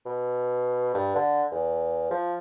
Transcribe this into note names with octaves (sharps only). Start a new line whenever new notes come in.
B2
G2
D3
E2
F3